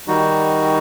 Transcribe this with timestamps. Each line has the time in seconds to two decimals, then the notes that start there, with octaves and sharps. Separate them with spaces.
0.08 D#3 G3 D#4 F#4